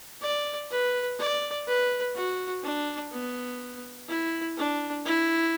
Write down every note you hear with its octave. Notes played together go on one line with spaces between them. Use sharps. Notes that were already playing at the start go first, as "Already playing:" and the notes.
D5
B4
D5
B4
F#4
D4
B3
E4
D4
E4